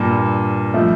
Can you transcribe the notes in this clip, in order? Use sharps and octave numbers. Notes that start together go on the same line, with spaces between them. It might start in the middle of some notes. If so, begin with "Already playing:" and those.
Already playing: G2 A#2
F3 A3